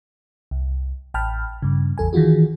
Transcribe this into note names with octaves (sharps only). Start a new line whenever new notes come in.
C2
A1 G5 A5 B5 F6
G2 C#3
A1 E2 A4 G#5
D#3 E3 F4 F#4 G#4